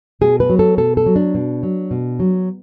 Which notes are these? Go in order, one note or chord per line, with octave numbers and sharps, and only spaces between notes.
B2 G#4
B4
F#3
A4
B2 A4
A4
F#3
D4
B2
F#3
B2
F#3